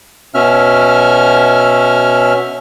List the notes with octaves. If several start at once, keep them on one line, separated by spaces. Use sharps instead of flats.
B2 C#4 E5 F6